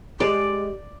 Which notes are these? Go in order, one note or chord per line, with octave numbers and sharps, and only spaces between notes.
G#3 G4 D5